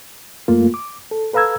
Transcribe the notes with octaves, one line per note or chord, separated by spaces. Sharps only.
F#2 A3 A#3 F4
D6
A4
A4 B4 F5 A#5 E6 G#6